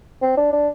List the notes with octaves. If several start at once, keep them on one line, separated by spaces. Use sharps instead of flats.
C4
D4
D4